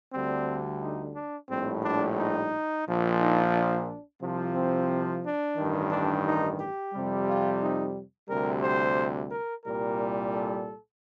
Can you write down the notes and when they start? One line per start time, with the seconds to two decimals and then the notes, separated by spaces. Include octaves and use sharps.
0.13 D2 D3 G3 C4
0.82 D#4
1.15 D4
1.49 A#1 A2 G3 C4
1.84 D4
2.18 D#4
2.86 A#1 A#2 F3
3.19 D#4
3.54 D4
4.21 C2 C3 F3
4.55 C4
5.24 D4
5.57 A1 G2 D#3
5.91 D4
6.26 D#4
6.59 G4
6.94 F2 C3 G3
7.27 F4
7.60 D#4
8.29 D2 C3 G3 A#4
8.62 C5
9.32 A#4
9.65 C2 A#2 G3 A#4
10.33 A4